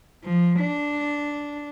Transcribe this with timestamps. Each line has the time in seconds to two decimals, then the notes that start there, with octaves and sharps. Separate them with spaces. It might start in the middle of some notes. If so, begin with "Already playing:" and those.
0.23 F3
0.60 D4